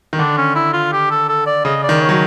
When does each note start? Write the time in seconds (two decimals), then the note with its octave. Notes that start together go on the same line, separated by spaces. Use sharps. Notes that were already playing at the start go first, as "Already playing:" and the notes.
0.13 D#3
0.19 D3 D4
0.38 C#4
0.55 E4
0.74 F4
0.92 G4
1.11 A4
1.29 A4
1.47 D5
1.65 C#3 D#5
1.83 D5
1.89 D#3
2.02 C#5
2.09 F#3